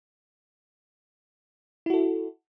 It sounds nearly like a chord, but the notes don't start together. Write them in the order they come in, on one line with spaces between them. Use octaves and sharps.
E4 F#4 A4